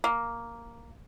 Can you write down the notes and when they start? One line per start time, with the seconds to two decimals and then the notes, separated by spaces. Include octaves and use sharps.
0.04 A#3